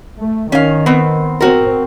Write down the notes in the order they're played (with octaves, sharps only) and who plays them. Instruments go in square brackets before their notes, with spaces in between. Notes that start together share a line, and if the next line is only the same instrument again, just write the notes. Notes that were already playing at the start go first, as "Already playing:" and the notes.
[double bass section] A3
[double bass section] D#3 [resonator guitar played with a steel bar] C#4 F5
[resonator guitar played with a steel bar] B3 C4
[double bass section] C4 [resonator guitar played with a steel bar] F#4 A#4